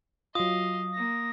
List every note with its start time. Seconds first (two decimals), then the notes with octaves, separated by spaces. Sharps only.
0.35 F#3 F4 D#5 F5 D#6
0.93 A#3 A#6